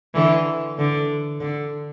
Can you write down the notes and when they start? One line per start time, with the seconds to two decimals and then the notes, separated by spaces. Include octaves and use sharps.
0.15 D3 E3
0.78 D3
1.41 D3